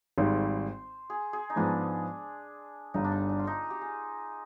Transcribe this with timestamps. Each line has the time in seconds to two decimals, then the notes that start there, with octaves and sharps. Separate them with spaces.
0.18 G#1 G#2 D#3 G3 C5
1.10 G#4
1.33 G#4
1.50 D#4
1.56 G#2 F3 G#3 B3 D4
2.94 G1 G2 D3 D#4
3.04 D4
3.12 D#4
3.29 D4
3.39 F4
3.47 D#4
3.70 G4
3.81 G#4